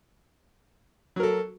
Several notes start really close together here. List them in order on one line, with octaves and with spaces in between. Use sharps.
F#3 A#4 A4